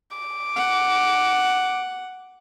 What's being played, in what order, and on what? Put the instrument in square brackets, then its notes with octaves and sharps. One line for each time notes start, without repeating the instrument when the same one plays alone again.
[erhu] D6
[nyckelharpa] F#5